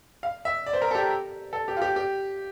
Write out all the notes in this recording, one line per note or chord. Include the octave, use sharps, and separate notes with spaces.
F5
E5
D5
C5
A#4
A4
G4
A4
G4
F4
G4
G4